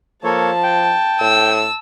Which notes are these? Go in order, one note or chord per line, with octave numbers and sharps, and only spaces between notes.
F3 A#3 A4 C#5 A5
G5
A2 E6